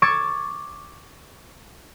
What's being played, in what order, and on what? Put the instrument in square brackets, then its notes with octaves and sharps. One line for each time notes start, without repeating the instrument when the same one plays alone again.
[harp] C#6 D6 E6 G#6 A6 C#7